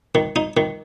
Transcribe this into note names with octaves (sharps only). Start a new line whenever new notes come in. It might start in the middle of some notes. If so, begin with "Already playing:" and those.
D#3
D#4
D#3